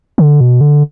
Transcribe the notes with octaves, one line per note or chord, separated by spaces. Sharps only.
D3
B2
D3